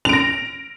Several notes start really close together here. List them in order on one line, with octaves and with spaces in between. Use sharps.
F7 D7 A#6